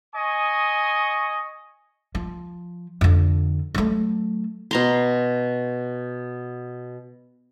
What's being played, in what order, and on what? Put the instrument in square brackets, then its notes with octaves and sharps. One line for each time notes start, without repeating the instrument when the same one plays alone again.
[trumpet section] D#5 G#5 C#6 D#6
[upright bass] F3
F2 D3
F#3 A3
[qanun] B2 A#5 C6